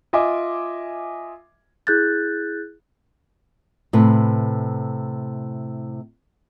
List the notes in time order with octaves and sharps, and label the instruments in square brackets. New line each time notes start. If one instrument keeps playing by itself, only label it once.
[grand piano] F4 D#5 E5 G#5 D6
[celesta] E4 G#4 F#6 G6 A6
[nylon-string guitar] A2 C3 B4